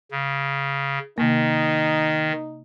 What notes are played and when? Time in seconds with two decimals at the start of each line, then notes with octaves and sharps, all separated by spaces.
0.11 C#3
1.18 C3 D#3 A#3 D#4